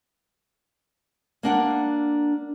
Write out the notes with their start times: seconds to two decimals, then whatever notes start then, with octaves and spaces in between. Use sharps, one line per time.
1.43 A#3 D4 F#5